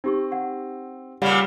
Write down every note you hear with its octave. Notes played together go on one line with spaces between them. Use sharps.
C4 D#4 G4 C#6
F#5
A#2 C#3 G3 F#5